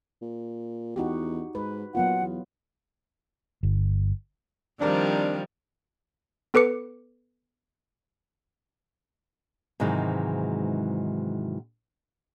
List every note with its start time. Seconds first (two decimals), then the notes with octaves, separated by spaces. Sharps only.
0.22 A#2
0.96 E2 D#4 F#4 G4
1.55 G#2 B4
1.95 A#2 F#3 B3 F4 F#5
2.21 E2
3.63 G1
4.80 D#3 F3 G3 C4 D4 A#4 D5
6.54 B3 A4 B4 D6 C#7
9.80 G#2 C3 D#3 E3 F#3 G#3